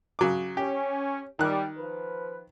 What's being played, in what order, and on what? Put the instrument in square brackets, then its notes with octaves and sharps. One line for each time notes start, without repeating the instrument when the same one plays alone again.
[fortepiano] C#3 F#3 D6
[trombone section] C#4 [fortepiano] G4
[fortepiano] D#3 F#6 [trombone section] G3
[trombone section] F3 B4